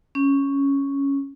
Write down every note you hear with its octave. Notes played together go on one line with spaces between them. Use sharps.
C#4